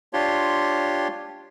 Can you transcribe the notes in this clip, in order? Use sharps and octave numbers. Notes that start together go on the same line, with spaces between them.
D4 F4 G4 C#5 C6